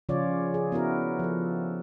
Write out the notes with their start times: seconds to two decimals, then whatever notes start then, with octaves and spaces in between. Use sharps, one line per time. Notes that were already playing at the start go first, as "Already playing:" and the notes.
0.09 C#3 F3 C#4 F4 C#5 D5
0.54 G#4
0.72 B3 E4 F#4 A#4
1.19 F3 A4